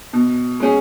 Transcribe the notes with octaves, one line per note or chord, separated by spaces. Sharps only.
B2
G#3 C#4 G#4